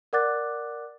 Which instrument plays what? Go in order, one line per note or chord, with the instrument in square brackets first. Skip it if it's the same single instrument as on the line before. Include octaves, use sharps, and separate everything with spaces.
[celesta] A#4 D5 F#5 D6 F#6 A6